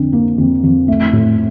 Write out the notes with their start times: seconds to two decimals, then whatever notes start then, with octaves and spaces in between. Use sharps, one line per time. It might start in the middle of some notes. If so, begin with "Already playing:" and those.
Already playing: F2 D3
0.13 A#3
0.38 F2
0.63 F2
0.88 A3
1.13 A2